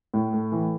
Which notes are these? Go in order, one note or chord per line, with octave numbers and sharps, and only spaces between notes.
A2
A3
E3